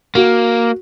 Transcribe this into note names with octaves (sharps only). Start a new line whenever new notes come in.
A#3 F#4